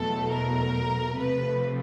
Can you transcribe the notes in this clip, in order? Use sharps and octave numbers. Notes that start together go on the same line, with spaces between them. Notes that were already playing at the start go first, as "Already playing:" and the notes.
Already playing: E2 B2 F#3 A3 A4
A#4
C3 F3 A3 B4